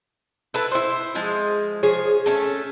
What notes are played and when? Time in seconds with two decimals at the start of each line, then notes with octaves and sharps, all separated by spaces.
0.54 E4 A4 B4 A5
0.72 E4 C5
1.15 F3 G#3
1.83 F3 G#4 C#5
2.26 A3 C#4 A4